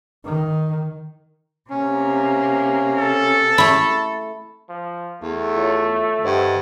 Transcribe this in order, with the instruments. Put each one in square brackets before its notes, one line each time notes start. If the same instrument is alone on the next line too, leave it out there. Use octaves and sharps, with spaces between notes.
[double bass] D#3
[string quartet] C3 A#3 [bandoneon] C#4
[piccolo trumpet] A4
[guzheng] A3 E4
[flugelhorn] F3
[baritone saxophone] E2 [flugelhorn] A3
[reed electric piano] F4 C#5
[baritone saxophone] G2 [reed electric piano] C5 D#5 F#5